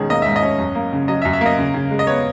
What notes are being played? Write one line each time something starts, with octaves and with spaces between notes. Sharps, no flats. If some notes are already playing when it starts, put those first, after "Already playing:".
Already playing: G#2 B2 D#3 C#4 G#4
A#3 D#5
G#2 E5
D#5
C#4
F#2
A#3
C#3
F#3 D#5
E5
F#2
E5
A#3 D#5
C#3
C#3
G#3
D#5
B3 C#5